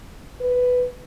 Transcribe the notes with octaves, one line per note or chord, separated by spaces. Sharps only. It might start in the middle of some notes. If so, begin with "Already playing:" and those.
B4